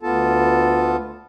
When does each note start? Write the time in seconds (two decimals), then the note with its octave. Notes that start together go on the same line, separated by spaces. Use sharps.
0.03 D2 B3 F4 A4 A5